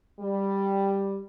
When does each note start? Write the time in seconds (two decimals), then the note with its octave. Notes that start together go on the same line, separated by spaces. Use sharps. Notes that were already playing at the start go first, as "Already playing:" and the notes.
0.20 G3